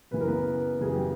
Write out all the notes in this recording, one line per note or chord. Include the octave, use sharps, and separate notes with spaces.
F#2 C#3 E3 B4
A#4
B3 B4
F#2 C#3 E3 G#4
G4